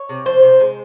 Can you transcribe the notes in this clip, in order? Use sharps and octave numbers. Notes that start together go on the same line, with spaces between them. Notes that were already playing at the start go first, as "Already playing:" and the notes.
Already playing: C#5
C3
F3 C5
C3
G#3